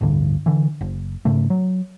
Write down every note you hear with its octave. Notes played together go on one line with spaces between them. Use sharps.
A1 D2 G2 D3
D3 E3
F#1
G#2 C#3 A3
F#3